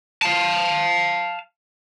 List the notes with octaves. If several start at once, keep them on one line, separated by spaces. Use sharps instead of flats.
F5 A5